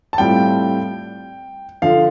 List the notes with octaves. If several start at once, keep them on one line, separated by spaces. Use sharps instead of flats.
A5
A2 G3 C4 F4 G5
D3 F3 F5